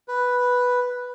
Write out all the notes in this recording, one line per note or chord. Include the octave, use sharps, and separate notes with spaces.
B4